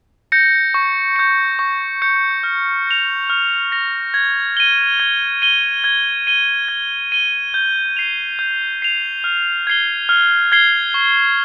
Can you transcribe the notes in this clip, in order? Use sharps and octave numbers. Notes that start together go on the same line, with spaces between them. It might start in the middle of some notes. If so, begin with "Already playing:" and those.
G6 A#6 C#7
C#6
G6 C#7
C#6
G6 C#7
F6
A#6 F7
F6
A#6 F7
G#6
D#7 G7
G#6
D#7 G7
G#6
D#7 G7
G#6
D#7 G7
G6
C7 F7
G6
C7 F7
F6
G#6 C7 G7
F6
G#6 C7 G7
C#6